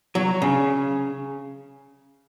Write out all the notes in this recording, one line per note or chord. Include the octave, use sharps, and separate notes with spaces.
F#3
C#3